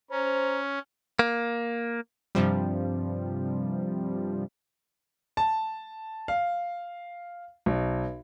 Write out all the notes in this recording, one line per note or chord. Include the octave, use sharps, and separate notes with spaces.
C#4 C5 A#5
A#3
G2 C3 F3 G3
A5
F5
B1